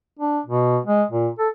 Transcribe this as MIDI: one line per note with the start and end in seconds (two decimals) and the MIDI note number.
0.19 0.40 62
0.46 0.78 47
0.85 1.03 56
1.11 1.28 46
1.39 1.48 69